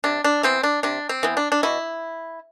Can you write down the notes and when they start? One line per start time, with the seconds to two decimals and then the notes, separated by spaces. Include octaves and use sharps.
0.04 C3 D4
0.24 D4
0.43 E3 B3 C4
0.63 D4
0.83 C3 D4
1.09 C4
1.23 E3 B3
1.37 D4
1.52 D4
1.63 B2 E4